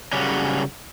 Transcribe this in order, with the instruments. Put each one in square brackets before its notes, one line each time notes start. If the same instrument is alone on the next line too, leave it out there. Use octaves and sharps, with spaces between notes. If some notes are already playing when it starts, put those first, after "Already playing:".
[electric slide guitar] C#3 F#3 G3 C#4